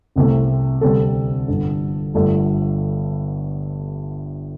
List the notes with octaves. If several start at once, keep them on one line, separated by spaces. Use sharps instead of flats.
C2 C3 A3
D2 C3 G3 C4 A4
G1 G2 D3
G1 G2 D3 A3